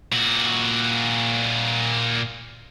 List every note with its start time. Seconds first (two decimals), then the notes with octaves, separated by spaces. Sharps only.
0.12 A#2 F#4